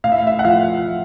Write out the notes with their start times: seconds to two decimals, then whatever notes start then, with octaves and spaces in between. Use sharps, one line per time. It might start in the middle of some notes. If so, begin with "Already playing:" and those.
0.04 A2 F5
0.12 E5
0.27 E5
0.39 F#5
0.45 F3 F5